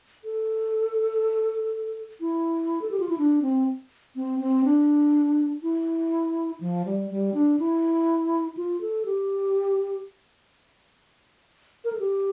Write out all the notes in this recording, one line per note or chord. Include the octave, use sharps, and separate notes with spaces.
A4
E4
A4
G4
F4
E4
D4
C4
C4
C4
D4
E4
F3
G3
G3
D4
E4
F4
A4
G4
A#4
A4
G4